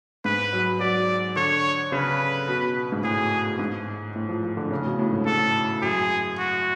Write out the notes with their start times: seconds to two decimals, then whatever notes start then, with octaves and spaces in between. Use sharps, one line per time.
0.25 G#2 B4
0.53 F#3
0.80 F#3 D5
1.36 D3 C#5
1.92 C#3 B4
2.48 B2
2.92 G#2
3.03 A2 G#4
3.59 G#2
4.16 A2
4.29 F3
4.43 F3
4.57 D3
4.71 C#3
4.79 A2
4.85 B2
4.99 A2
5.13 G#2
5.26 G#2 A4
5.82 F#2 G#4
6.39 F#4